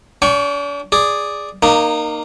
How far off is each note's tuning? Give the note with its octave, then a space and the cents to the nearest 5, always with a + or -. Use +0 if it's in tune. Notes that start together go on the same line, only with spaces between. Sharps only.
D4 -45 G5 +0 C#6 +5
G#4 -5 D5 +0
A#3 +0 D#4 -25